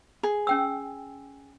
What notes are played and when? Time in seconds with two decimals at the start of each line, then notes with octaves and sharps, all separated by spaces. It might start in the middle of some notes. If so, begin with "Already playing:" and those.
0.23 G#4
0.47 C#4 G5 E6